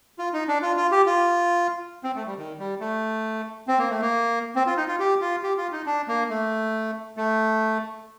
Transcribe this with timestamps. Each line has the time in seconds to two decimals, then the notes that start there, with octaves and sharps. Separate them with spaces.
0.19 F4
0.34 D#4
0.48 D4
0.62 F4
0.77 F4
0.92 G4
1.06 F4
2.04 C4
2.15 A3
2.27 G3
2.37 D#3
2.59 G3
2.80 A3
3.68 C4
3.79 A#3
3.90 A3
4.01 A#3
4.56 C4
4.66 F4
4.77 D#4
4.88 F4
4.99 G4
5.21 F4
5.43 G4
5.57 F4
5.72 D#4
5.86 D4
6.08 A#3
6.30 A3
7.17 A3